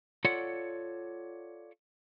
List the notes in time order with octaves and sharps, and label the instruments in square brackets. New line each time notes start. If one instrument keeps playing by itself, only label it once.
[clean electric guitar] F4 A4 C#5 D5 F#5